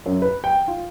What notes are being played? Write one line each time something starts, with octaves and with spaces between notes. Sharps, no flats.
F#2
B4
G5
F4